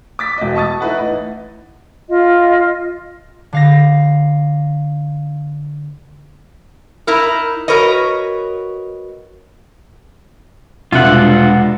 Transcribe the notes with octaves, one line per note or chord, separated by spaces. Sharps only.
D6 A6 B6
E1 D#5
A5 C#6 D#6 A6
D#4 E4 B4 F#5
A1
F4 D#5
D3 F5 A#6
D#4 E4 A#4
F#4 A#4 B4 C#5 D#5
E1 C3 G3 G#3 D4 F4 E5 F#5